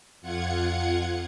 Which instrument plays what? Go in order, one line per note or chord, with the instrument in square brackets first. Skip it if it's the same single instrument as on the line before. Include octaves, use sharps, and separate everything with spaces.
[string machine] F2 F4 F#5 G#6 C#7